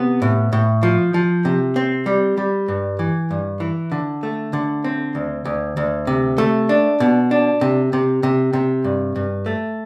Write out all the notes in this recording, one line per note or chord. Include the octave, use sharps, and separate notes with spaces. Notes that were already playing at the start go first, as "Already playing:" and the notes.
Already playing: C3 B3
A2
A2
F3
F3
C3
C4
G3
G3
G2
E3
G2
E3
D3
A3
D3
C4
D2
D2
D2
C3
A3
D4
B2
D4
C3
C3
C3
C3
G2
G2
A3